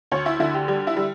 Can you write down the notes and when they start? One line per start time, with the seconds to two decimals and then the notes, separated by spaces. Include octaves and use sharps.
0.12 D2 C#5
0.26 E4
0.40 D3 E4
0.54 G4
0.68 G3 G4
0.87 E4
0.97 G3